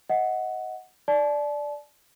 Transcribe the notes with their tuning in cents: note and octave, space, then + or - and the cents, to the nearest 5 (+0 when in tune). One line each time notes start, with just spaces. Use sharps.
D#5 +20 F#5 +0
D5 +0 A5 -35